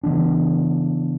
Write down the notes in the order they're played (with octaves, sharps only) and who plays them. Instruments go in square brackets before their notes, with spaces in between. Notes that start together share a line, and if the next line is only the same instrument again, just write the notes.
[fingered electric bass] C#3 E3 B3 D4